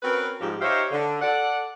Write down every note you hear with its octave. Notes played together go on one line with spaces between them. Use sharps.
C4 C#4 F#4 A#4 B4
G#2 F3 G3
D#4 G4 C5 C#5 E5 F5
D3
A4 D5 F#5